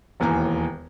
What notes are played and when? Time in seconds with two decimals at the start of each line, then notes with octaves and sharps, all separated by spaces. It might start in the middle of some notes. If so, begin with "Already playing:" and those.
0.20 E1 D#2 E3 G#5 A#5